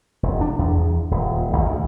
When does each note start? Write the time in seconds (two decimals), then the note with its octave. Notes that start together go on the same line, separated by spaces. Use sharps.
0.23 E1
0.41 D4
0.59 E2
1.11 D#1
1.53 G#1
1.65 D2